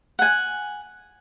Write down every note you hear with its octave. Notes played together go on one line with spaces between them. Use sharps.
F#5 G#5